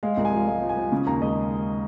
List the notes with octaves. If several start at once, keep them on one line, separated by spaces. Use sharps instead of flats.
G#3 F5
C2
G#5
F3 F5
G#3 F5
F3
G#5
F3
C#3
D#2 A#5
G#3 D#5